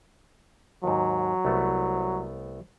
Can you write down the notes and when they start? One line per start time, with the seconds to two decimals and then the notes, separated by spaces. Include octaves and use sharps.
0.84 D#2 G#2 F#3
1.45 C2 A3 B3